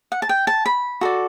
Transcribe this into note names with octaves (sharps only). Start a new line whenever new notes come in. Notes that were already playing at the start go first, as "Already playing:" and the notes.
F#5
A5
G5
A5
B5
F#4 A4 D5